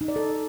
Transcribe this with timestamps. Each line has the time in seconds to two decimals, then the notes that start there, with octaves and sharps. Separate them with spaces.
0.01 D#4
0.08 D5
0.16 A4